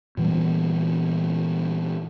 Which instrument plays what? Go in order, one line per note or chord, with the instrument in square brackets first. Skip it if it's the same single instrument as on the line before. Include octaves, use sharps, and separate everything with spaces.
[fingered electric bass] A#2 E3 G3 B3